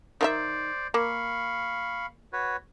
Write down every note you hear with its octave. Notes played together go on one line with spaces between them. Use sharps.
D#3 F4 C5 D5 E5
A#3 F5 B5 C#6
F#4 B4 C#5